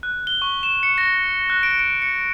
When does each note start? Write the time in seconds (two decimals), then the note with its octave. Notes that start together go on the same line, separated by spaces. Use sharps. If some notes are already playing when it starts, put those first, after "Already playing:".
0.03 F#6
0.27 G7
0.42 C#6
0.63 E7
0.83 C#7
0.98 A#6
1.50 F#6
1.63 D7
1.79 D7
2.02 C#7